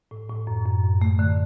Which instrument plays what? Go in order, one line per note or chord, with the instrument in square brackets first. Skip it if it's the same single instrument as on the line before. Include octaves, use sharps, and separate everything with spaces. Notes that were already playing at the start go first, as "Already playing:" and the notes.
[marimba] A2
A2
F#2
F#2
F#2
A3
D3